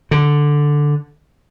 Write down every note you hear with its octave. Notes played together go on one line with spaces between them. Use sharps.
D3